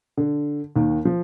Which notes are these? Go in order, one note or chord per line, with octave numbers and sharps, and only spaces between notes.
D3
D#2 D#3
F3